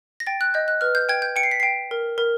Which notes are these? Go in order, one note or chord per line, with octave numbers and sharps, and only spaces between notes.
A#6
G5 A6
F#6
D#5 G6
F#6
B4 F6
G6
G5 G#6
G6
G5 C#7
C7
B6
G5 C7
A#4
A#4